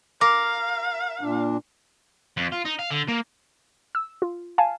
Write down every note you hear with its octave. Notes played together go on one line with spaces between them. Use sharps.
A#4 F5 D6
A#2 D4
F2
F4
D#4
F5
D3
A#3
E6
F4
F5 G#5 A5